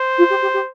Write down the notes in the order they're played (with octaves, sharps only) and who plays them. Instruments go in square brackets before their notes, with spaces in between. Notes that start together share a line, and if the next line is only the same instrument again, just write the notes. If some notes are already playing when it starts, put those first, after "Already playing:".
Already playing: [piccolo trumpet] C5
[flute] F4
G4
G4
G4